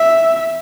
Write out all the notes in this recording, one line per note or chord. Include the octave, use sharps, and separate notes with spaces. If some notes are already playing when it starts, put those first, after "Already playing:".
Already playing: E5